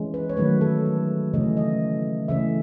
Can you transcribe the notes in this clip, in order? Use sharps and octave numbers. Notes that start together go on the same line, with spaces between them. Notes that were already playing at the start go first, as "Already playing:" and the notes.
Already playing: E3 G#3 C#4
B4
C#5
D#3 F#3 A3 B4
A4
B4
C#3 E3 A3 C#4 D#5
D#5
C#3 E3 A3 C#4 E5